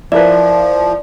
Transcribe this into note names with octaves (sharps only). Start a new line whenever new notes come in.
F3 E4 A#4 B4 D5